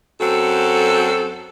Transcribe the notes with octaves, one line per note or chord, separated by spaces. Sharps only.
F#2 C4 F#4 A4